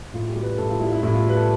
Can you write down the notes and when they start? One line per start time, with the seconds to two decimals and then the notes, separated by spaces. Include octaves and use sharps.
0.13 A2 F4
0.29 G4
0.36 G3
0.43 B4
0.58 A2 A4
0.70 F4
0.80 G3 E4
0.92 E4
1.03 A2 E4
1.14 F4
1.25 G3 B4
1.37 A4